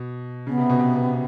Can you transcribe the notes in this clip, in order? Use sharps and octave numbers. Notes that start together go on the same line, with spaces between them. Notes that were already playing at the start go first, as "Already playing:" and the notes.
Already playing: B2
C#3 B3
C3
B2
C3